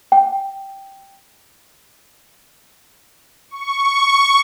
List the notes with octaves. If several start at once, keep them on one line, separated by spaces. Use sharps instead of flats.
G5
C#6